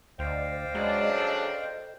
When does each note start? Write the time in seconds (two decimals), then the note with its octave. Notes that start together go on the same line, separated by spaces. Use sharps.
0.19 D2 C5 D5 D#5 F5 G5
0.75 C#3 F#3 G#3 D4
1.18 A4